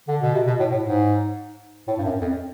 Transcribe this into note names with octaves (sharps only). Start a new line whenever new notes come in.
D3
B2
C3
B2
A2
A2
G#2
A2
G2
F#2
F2